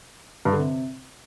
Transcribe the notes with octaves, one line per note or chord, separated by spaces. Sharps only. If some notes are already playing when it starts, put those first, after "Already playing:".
G2
D3
C3